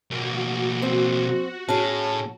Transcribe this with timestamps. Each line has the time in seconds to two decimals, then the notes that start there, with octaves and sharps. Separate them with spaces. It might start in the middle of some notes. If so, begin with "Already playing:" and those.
0.11 B1 A#3 F#4
0.82 C4
1.69 A2 C#4 G#4 A5